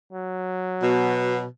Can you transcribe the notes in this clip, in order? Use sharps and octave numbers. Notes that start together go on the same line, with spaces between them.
F#3
B2